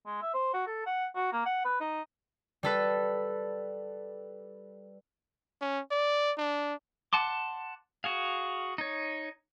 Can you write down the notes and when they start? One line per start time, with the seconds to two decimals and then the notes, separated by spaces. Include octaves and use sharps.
0.06 G#3
0.22 E5
0.34 C5
0.54 F#4
0.67 A4
0.86 F#5
1.16 F#4
1.33 A#3
1.46 F#5
1.65 B4
1.81 D#4
2.63 G3 A4 B4
5.61 C#4
5.91 D5
6.38 D4
7.13 F#5 A5 C6 D6
8.04 F#4 G#4 F5
8.78 D#4 C#5